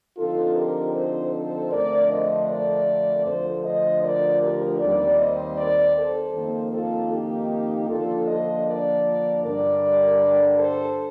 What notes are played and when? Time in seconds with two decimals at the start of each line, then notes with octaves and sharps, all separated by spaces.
0.17 D3 F3 C4 D#4 F4 A4
0.56 G4 A#4
0.94 A4 C5
1.33 A4 C5
1.71 F2 D3 A3 D4 A#4 D5
2.10 C5 D#5
2.49 A#4 D5
3.26 D2 D3 F3 A4 C5
3.64 C5 D#5
4.03 A#4 D5
4.42 G4 A#4
4.80 D#2 D#3 G3 C4 A#4 D5
5.19 C5 D#5
5.57 A#4 D5
5.96 A4 C5
6.34 F2 D#3 A#3
6.73 F4 A4
7.12 D#4 G4
7.89 D3 F3 A#3 D4 F4 A4
8.27 C5 D#5
8.66 A#4 D5
9.43 G2 D3 G3 D4 A#4 D5
10.59 A4 C5